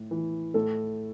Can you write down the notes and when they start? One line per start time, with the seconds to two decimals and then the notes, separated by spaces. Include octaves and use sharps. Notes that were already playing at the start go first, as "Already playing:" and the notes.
Already playing: A2
0.11 E3
0.54 A2 A4